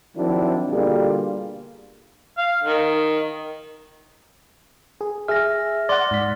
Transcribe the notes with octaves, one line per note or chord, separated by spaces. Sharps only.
D#3 F3 F#3 C4 D4 E4
B2 D3 G3 A#3 F4 G#4
F5
D#3
G#4
G#4 E5 F6 A#6
D5 F#5 C6 A6
G#2 B6